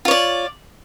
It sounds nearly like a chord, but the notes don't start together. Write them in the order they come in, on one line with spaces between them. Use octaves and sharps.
F4 C#5 D5